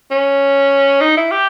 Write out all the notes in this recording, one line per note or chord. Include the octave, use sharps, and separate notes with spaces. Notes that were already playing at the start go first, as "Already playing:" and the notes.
C#4
D#4
E4
G4